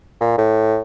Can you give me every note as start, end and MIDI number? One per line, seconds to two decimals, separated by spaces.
0.21 0.37 46
0.38 0.80 45